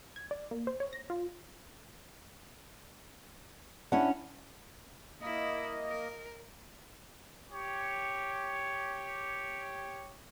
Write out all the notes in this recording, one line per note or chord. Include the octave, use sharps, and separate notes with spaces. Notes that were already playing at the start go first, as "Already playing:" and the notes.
G#6
D5
A#3
C5
C#5
A#6
F4
C#4 D4 E4 C#5 F#5
A#3 E4 D#5
A#4
G4 C#5